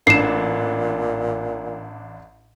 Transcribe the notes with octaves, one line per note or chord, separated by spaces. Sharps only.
A1 A#2 D4 C7 E7